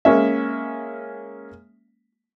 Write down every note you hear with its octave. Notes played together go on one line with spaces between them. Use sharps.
G#3 A#3 C#4 E5